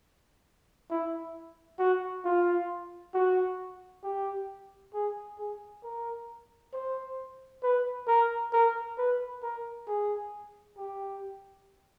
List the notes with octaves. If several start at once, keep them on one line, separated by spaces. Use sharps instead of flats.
E4
F#4
F4
F#4
G4
G#4
G#4
A#4
C5
B4
A#4
A#4
B4
A#4
G#4
G4